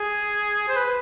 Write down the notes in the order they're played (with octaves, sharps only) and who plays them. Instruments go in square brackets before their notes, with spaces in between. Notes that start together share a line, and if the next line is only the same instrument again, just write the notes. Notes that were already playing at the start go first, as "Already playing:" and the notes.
Already playing: [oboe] G#4
C5
B4